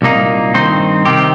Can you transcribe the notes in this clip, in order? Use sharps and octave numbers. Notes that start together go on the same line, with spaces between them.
C2 A#2 A#3 D#4
G2 D#3 C4 D#4 C5
C3 D#3 C4 G4